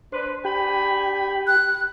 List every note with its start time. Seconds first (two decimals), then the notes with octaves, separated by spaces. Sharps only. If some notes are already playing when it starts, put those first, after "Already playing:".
0.12 D4 B4 C5
0.45 D4 G4 G5 G#5 B5
1.47 F#6